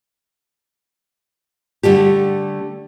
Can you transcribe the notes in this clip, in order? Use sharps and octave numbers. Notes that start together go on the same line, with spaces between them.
D3 G3 A3 G4